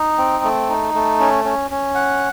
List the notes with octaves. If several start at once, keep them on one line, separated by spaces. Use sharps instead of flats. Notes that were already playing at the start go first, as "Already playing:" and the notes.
Already playing: D#4
C4
A3
D#4
A3
C#4
C#4
C#4
F#5